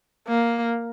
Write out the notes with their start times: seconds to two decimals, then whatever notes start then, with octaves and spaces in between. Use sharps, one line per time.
0.28 A#3